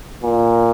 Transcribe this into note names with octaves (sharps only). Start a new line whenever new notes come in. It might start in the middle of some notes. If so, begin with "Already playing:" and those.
A#2